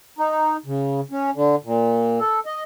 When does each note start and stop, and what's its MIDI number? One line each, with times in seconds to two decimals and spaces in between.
0.19 0.57 63
0.66 1.01 49
1.11 1.30 61
1.35 1.55 50
1.64 2.19 46
2.20 2.40 69
2.46 2.64 75